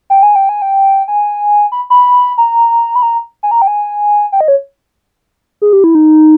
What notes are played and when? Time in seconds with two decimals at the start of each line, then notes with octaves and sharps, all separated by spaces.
0.10 G5
0.23 G#5
0.36 G5
0.49 G#5
0.62 G5
1.08 G#5
1.72 B5
1.90 B5
2.38 A#5
2.96 B5
3.02 A#5
3.43 G#5
3.51 A#5
3.62 G5
3.67 G#5
4.32 G5
4.41 D#5
4.48 C#5
5.62 G#4
5.73 G4
5.84 E4
5.95 D#4